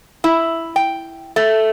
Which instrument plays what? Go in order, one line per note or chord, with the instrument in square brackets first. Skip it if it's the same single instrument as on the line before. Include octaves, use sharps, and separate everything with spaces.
[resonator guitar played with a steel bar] E4
G5
A3